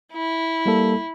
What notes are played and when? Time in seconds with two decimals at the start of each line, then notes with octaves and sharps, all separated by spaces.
0.13 E4
0.66 G3 A#3 A4